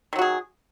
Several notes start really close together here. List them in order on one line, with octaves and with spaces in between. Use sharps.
D#3 F#3 F#4 G#4